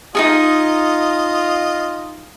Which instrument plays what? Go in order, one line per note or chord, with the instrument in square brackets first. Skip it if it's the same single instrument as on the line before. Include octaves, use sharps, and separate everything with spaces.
[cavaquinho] D#4 F#4 G#4 [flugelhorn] F4 [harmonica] D#5